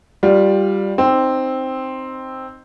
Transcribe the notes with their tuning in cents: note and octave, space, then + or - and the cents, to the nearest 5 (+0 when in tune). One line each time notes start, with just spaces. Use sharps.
G3 +0 F4 +15
C4 +0 D#4 -10